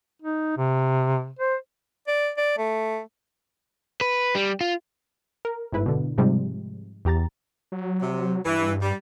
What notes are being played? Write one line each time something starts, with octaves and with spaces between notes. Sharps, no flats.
D#4
C3
C5
D5
D5
A3
B4
G3
F4
A#4
G1 G#2 E4 B4
B2 D3
G#2 C3 F3 G3 G#3
E2 G4 A#5 A6
F#3
C3
G2 E3
G3